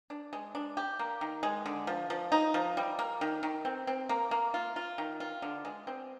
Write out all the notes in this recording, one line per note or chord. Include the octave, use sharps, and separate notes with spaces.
D4
G#3
D4
G4
A#3
D#3
G#3
D3
F3
F3
D#4
F3
G3
A#3
D#3
D#3
C4
C4
A#3
A#3
F4
F4
D#3
F4
D3
G#3
C4